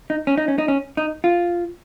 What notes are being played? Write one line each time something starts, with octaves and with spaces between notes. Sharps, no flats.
D#4
C#4
D#4
C#4
D#4
C#4
D#4
F4